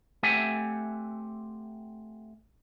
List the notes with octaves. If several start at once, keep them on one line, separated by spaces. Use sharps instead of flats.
A3 C4 G4 E5 F#5 G#5